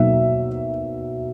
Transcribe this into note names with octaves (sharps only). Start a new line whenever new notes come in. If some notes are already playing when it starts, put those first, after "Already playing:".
Already playing: B2 F#3 A#3 D#4 E5